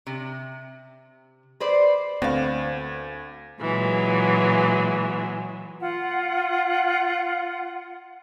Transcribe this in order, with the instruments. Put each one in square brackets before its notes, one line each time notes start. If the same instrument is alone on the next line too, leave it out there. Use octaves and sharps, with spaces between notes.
[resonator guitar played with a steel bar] C3
B4 C5 D5
[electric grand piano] D2 [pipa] B3 F5 [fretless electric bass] C4
[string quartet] A#2 E3 F#3 G#3
[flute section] F4 F#5